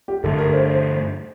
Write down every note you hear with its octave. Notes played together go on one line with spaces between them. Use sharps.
G4
G2 D3 A3 A4
A#4
C5
C5